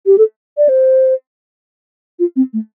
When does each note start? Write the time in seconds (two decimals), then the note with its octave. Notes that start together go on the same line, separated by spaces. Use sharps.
0.06 G4
0.18 A4
0.57 D5
0.69 C5
2.19 F4
2.36 C4
2.53 A3